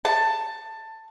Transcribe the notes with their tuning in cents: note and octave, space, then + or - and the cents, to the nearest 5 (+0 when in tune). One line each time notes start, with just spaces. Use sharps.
A5 +15